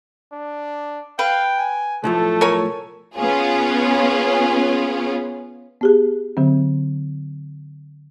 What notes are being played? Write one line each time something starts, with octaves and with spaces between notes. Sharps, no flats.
D4
B4 F5 G5
G#5
B1 A2 F3 A3 A4
A#4 C#5 G#5
B3 C#4 F4 G#4
B3 G4 G#4
D3 F#3 C4